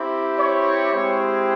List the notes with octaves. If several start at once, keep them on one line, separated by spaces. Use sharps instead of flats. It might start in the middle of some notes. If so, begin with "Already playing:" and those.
Already playing: C4 E4 G4
C#5
G#3 C4 E4 G4